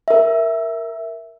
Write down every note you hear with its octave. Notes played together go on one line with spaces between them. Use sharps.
A#4 E5